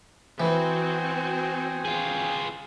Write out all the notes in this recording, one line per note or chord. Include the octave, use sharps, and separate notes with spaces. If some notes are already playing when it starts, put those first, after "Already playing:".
E3 C4 F#4 G5 G#5 D#6
F4 G#4